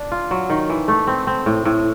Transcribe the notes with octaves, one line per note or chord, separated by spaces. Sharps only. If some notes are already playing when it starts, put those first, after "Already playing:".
Already playing: D4
F4
F#3
D#3
E3
A3
C4
C4
A2
A2